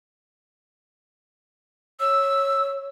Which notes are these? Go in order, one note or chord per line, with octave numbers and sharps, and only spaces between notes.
C#5 E6